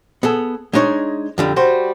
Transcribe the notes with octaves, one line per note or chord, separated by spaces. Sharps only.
B3 G#4 A4
G#3 D4 D#4 C#5
F2 D3 G3
G3 F#4 C5